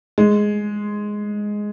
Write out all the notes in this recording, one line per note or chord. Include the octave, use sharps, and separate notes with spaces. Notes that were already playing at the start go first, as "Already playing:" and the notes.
G#3